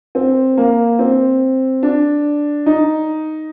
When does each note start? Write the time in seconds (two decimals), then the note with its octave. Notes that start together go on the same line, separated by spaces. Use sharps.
0.15 C4
0.57 A#3
0.99 C4
1.83 D4
2.66 D#4